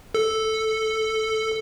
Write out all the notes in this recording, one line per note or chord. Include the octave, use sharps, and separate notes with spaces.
A4